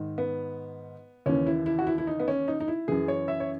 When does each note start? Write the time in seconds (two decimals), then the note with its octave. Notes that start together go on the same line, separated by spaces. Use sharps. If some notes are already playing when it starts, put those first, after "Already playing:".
Already playing: G#2 D#3
0.18 B3
1.26 D#2 C#3 E3 C#4
1.47 E4
1.66 E4
1.79 F#4
1.87 E4
1.98 E4
2.07 D#4
2.20 B3
2.28 C#4
2.48 D#4
2.60 D#4
2.68 E4
2.88 F#2 E3 G#4
3.08 C#5
3.28 E5
3.40 C#5